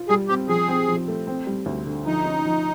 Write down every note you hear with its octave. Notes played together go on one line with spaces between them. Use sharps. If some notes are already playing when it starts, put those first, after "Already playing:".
Already playing: F4
G3 G#4
C4 G4
F3 G#4
C4
F3
A3
C4
G3
D2
D3
F3 D#4
C#4
F3